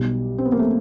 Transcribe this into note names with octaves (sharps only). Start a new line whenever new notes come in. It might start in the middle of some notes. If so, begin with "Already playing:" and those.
Already playing: B1 B2 G3
C4
B3
A#3
A3